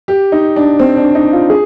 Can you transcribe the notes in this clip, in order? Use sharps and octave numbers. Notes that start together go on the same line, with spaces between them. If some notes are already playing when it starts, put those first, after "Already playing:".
G4
D#4
D4
C4
D4
D#4
F4
G#4